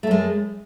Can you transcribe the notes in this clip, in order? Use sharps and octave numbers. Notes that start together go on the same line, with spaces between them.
F#2 G#3 A3